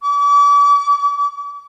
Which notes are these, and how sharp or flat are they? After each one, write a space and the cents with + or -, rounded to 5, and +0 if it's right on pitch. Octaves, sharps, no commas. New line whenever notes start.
D6 -40